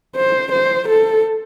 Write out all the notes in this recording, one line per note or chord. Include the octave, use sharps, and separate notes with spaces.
C5
C5
A4